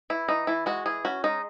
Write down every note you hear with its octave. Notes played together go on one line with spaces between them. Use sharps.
E3 E4
E3 D#4
E3 E4
G#3 F#4
E3 G#4
C#4 F#4
G#3 D#4